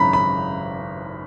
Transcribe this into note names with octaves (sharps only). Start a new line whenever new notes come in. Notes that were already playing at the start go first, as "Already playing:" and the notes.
Already playing: G#1 F#2 C#3 A#5 B5
B5